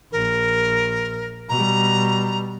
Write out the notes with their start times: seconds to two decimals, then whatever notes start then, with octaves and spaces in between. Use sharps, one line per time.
0.12 A#1 A#4
1.48 B2 G3 A#5